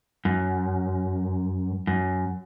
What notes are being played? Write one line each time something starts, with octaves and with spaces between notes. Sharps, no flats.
F#2
F#2